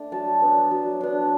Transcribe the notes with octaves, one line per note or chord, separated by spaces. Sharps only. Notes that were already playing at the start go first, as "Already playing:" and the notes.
Already playing: A3 D4
F#3 A5
B3 D4
F#3
B3 D4